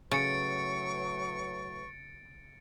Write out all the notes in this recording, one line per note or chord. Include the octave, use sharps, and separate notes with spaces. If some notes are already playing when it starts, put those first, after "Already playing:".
A2 C#3 F#3 B4 C#6 A6 C#7 D7